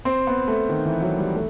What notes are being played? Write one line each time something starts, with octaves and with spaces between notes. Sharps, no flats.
C4
B3
A3
D#3
E3
F#3
G3
A3